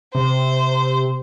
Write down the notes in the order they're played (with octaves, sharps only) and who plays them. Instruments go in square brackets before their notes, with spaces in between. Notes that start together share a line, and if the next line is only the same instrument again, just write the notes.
[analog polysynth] C3 [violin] C5